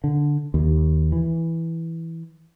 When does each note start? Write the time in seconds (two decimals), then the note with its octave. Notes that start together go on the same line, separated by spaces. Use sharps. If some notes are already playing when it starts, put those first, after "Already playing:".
0.04 D3
0.54 D#2
1.12 E3